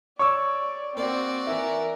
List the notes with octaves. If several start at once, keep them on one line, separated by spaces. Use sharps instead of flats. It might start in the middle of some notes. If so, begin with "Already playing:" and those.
C#5 D5 C#6 D6 E6
A#3 C4 F#4 D5
E3 E4 A#4